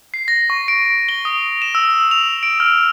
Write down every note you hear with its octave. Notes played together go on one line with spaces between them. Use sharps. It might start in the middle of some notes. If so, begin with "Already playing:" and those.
C7
A#6
C#6
D7
G7
D#6
E7
E6
F7
D7
F6